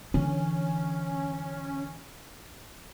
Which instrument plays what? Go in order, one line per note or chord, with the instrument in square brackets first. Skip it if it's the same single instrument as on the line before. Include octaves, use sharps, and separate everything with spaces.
[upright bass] D3 E3 [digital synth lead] C#4